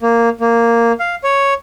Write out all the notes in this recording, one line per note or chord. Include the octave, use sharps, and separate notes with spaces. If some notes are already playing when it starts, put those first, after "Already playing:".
A#3
A#3
F5
C#5